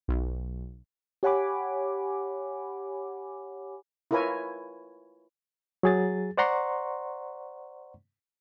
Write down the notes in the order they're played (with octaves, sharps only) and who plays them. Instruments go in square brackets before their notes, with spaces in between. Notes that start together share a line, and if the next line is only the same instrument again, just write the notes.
[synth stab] B1
[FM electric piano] G4 C#5 F#5 G#5 B5 D6
[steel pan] E4 F4 A#4 B4 C#5 G#5
[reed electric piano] F#3 G#4 A6
C5 D5 F#5 A#5 C6 C#6